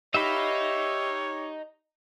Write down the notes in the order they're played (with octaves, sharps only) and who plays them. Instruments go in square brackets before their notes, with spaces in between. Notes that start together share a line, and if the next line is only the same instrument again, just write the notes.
[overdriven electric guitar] D#4 [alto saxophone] G4 [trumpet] C#5 [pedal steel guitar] E5 F5 B5